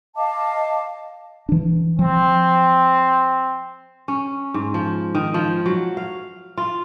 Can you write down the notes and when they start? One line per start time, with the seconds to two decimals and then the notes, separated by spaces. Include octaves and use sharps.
0.16 D#5 F5 A5 D6
1.49 E3 D4
1.99 F3 C4
4.08 C#4
4.54 G#2
4.74 F3
5.15 D#3
5.34 F3
5.66 F#3
5.97 F5
6.57 F4